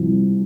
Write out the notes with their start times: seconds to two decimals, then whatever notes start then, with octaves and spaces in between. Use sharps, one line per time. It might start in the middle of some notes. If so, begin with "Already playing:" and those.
Already playing: C2 C3 F3